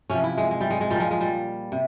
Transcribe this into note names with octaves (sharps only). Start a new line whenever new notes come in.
C3 F3 C#4
E4
G#3
G#3
G3
G#3
G#3
A#2 F3 G3
G#3
G#3
G3
C3